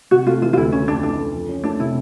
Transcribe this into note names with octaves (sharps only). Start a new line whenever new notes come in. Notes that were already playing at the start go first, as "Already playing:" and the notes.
C3 F#4
A3 F4
E3 F4
F4
D2 E4
C#3 C#4
F2 D4
E3 D4
F2
F3
C#4
A3 D4
C3 E4